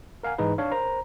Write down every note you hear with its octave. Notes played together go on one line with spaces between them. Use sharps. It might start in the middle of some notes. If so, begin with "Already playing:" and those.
A#4 F5 F#5 G#5
G#2 E3 D#4 G#4 B4
D4 C#5 F5
A#4 C5 A#5